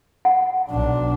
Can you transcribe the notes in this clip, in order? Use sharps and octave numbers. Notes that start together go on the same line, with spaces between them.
F#5
B1 D4